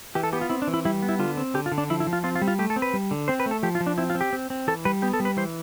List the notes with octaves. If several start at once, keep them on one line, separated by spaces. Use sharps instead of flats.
E3 G4
A4
B3 G4
F4
C4 E4
D4
E3
E4
G3 E4
B3
E4
D3 F4
C4
D3 G4
F4
D3
D4
F3 E4
E4
F3
F4
C4 F4
F4
G3
F4
A3 G4
A4
C4
B4
G3
D3
C4 C5
B4
A3
A4
F3 G4
F4
F3
D4
C4 E4
F4
C4
G4
C4
C4
E3 A4
G3 B4
B3 G4
A4
G3
B4
E3 C5